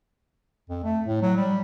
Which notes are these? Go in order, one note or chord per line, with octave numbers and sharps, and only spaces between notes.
F2
A3
A2
F#3
G3